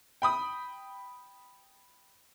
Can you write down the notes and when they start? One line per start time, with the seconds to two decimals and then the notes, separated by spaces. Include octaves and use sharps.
0.22 G5 B5 D#6